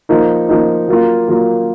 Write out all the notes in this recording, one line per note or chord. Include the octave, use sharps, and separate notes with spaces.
F3 A#3 D#4
F3 A#3 D#4
F#3 A#3 F4
F#3 A#3 F4